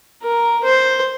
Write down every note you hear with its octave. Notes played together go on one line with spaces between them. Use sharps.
A#4
C5